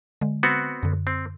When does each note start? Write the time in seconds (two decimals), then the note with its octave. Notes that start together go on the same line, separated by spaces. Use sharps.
0.21 D3 G#3
0.43 B3 C4 F#4
0.83 F#2 D3
1.07 C4